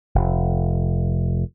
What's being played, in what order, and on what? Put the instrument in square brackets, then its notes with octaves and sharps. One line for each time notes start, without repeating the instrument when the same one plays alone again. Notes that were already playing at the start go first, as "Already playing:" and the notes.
[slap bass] F1